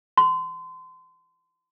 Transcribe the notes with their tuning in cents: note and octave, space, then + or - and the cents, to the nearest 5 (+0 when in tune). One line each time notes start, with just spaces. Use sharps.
C6 -30